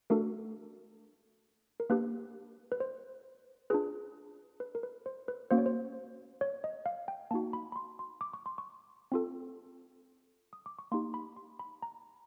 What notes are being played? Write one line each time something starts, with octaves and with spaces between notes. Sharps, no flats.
A3 D4 F#4 A4 A#4
A#4
A#3 D4 G4 B4
B4
C5
D4 F4 G#4 B4
B4
A#4
B4
C5
B4
A#3 C#4 F#4 C5
C#5
C5
C#5
D#5
F5
G5
A#3 D#4 F#4 A5
B5
B5
C6
C6
D6
C#6
C6
C#6
C4 F4 A4
D#6
D6
C#6
A#3 D#4 G4 C6
B5
C6
B5
A#5